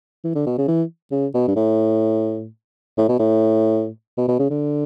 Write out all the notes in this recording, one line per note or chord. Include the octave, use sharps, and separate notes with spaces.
E3
D3
B2
C#3
E3
C#3
B2
G2
A2
A2
B2
A2
B2
B2
C#3
D3